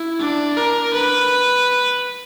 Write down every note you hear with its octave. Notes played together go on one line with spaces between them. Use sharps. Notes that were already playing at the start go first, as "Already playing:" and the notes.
Already playing: E4
D4
A#4
B4